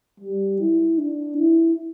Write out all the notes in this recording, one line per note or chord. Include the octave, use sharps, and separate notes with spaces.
G3
E4
D4
E4